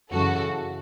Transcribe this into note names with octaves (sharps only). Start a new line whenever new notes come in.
F#2 C#3 E3 F#4 A4